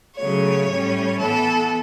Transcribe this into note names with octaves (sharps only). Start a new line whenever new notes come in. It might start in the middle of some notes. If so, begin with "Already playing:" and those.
C#3 F#3 A3 C#5
A2 G3 C#4
E3 B3 A4